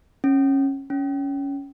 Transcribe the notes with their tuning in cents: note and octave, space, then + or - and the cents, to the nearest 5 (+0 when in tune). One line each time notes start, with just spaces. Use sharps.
C#4 -20
C#4 +10